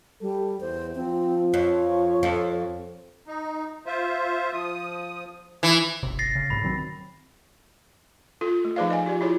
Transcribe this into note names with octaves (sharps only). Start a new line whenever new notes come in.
G3 A4
E2 C5
F3 C4
F2 C#5
F2
D#4
F4 C5 E5
F3 D#6
E3 D#6
D#1 G#1 C3
A6 A#6 C7
C#3
B1 G#2 C3 B5
D#3 F#3 C4
F4 A4
A3
F3 D#4 G#4 B4 D5 F5
D#5 G#5
F4 G4 D5
E4 F4 G#4 C#5